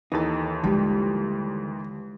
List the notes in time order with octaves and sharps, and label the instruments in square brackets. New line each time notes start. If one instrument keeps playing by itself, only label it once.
[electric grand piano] D#2 E3 [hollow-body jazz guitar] D#4 A4
[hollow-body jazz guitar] D3 G3 [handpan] F3 G#3 G4